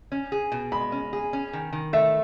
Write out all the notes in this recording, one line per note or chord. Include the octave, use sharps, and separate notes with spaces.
C#4
G#4
B2
G#3 B5
C#4
G#4
C#4
D#3
D#3
A3 E5